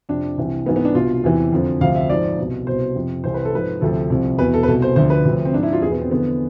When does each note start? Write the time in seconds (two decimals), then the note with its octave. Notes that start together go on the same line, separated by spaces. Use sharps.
0.09 F2 C3 F3 D4
0.37 C2 C3 E3
0.66 G#2 E3 B3
0.76 B3
0.85 D4
0.95 C2 B2 F4
1.24 E2 C3 E3
1.52 F2 D3 F3
1.81 D2 C3 F3 F5
1.95 E5
2.10 G#2 F3 D5
2.38 C2 B2
2.67 C2 B2 C5
2.96 F2 C3 F3
3.24 C2 C3 E3 C5
3.34 B4
3.45 A4
3.53 G#2 F3 B4
3.81 D2 C3 F3 A4
4.10 C2 C3 F3
4.39 E2 B2 B4
4.54 A4
4.63 B4
4.68 C2 B2 A4
4.82 C5
4.96 D2 D3 F3 C5
5.10 B4
5.25 D2 C3 F3
5.45 C4
5.53 G#2 F3 D4
5.63 E4
5.73 F4
5.82 E2 B2 G#4
5.92 B3
6.01 C4
6.11 E2 D3 F3 B3